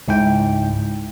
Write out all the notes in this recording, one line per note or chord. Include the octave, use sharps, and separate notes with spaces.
C#2 G#2 E4 G5